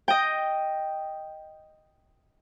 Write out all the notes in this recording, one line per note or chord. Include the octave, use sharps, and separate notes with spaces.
D#5 G5